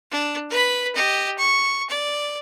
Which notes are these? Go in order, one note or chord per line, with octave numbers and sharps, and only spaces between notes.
D4
B4 B5
G4 D#5
C#6
D5